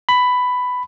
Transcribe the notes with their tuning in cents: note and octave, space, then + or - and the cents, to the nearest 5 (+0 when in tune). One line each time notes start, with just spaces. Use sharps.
B5 +10